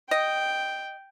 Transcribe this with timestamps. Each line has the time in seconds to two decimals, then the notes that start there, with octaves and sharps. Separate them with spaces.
0.11 D#5 G5